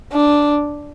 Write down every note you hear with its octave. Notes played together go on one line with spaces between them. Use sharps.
D4